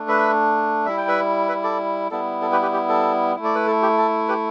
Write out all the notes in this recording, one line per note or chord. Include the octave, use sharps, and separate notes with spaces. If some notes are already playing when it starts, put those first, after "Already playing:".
Already playing: A3 D4
B4 E5
G3 E4 E5
G5
B4 E5
B4 E5
A4 D5
G3 B3 E4 A4
A4
G4 B4
G4 B4
G4
A4
A3 E4
D5
B4
A4
G4
A4
G4 B4